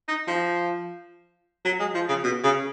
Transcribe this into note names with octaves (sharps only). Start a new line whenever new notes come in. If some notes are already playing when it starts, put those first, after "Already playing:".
D#4
F3
F#3
G#3
F3
C#3
B2
C#3